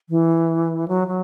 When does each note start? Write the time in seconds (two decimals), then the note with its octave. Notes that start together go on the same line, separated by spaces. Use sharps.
0.10 E3
0.88 F#3
1.08 F#3